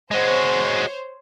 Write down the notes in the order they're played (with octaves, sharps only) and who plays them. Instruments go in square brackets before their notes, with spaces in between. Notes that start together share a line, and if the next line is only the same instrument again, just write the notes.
[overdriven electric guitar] G#3 F#4 [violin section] C5 C#5